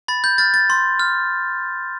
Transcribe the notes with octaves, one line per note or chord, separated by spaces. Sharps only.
B5 A6
G6
F6 A6
A6
C6
F6